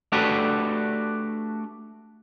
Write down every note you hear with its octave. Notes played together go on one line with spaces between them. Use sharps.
A3 D4 F#4 G4 A4 B4